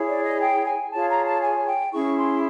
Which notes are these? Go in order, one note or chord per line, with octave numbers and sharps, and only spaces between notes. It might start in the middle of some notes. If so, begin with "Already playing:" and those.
Already playing: E4 G#4 C#5
D5
D#5
G5
G#5
F4 G#4 C#5 A5
A#5
A5
G#5
G5
C#4 E4 G#4 C#6
C6